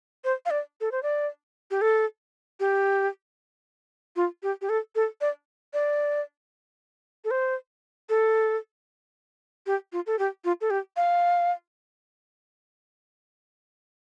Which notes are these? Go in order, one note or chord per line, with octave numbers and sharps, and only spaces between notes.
C5
F5
D5
A4
C5
D5
G4
A4
G4
F4
G4
G4
A4
A4
D5
D5
A4
C5
A4
G4
F4
A4
G4
F4
A4
G4
F5